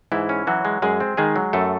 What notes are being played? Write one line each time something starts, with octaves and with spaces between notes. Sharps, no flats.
G#2 E3 E4
C#4
E3 F#3 F#4
G#3
F#2 G#3 G#4
C4
D#3 G#3 G#4
F#3
F#2 A3 A4